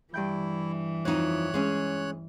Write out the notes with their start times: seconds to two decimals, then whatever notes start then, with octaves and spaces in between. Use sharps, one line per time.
0.14 G2 E3 E4 G5 G6
1.05 F2 D#4 C#5 F#6
1.54 G#3 C#4